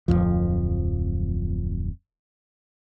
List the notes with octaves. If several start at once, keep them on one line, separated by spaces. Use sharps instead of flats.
D1 B1 F2 F3